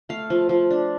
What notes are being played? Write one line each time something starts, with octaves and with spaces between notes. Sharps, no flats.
A3 F5
F3
F3
D4